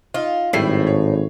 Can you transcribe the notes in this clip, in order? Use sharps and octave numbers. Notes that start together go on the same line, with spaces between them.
D#4 F4
G#1 A2 G3 E4 C7
C#5